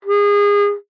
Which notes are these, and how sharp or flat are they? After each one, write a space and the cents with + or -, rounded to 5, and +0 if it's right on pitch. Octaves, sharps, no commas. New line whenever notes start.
G#4 -30